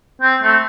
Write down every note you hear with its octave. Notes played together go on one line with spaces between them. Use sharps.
C4
A3